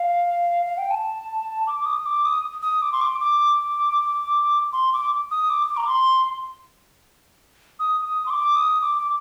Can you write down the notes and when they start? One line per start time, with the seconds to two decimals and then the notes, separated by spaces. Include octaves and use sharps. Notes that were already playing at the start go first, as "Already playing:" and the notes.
Already playing: F5
0.66 F5
0.78 G5
0.91 A5
1.67 D6
1.86 D#6
2.06 D6
2.25 D#6
2.62 D#6
2.82 D6
2.92 C6
3.01 D6
3.21 D6
4.73 C6
4.93 D6
5.31 D#6
5.50 D6
5.77 A#5
5.88 C6
7.80 D#6
8.05 D#6
8.26 C6
8.30 D6
8.56 D#6
8.81 D6